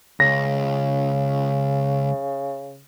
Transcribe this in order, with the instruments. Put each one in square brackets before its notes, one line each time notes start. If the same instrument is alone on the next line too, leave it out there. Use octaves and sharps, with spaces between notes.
[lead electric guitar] C#2 [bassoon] C#3 [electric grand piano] A#6